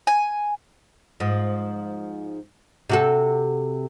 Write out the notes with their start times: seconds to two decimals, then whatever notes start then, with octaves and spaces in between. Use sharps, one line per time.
0.07 G#5
1.20 G#2 F3
2.89 C3 F#4 A4